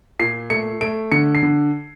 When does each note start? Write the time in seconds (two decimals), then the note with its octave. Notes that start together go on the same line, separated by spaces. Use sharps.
0.19 A#2 C7
0.50 A3 C#7
0.81 A3 D7
1.12 D3 C#7
1.35 C7
1.43 D3